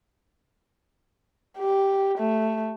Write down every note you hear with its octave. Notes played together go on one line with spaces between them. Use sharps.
G4
A3